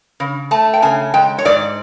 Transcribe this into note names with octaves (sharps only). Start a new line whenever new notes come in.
C#3
A3 A5
G5
C#3 G#5
G#3 G5
C#5
G#2 D5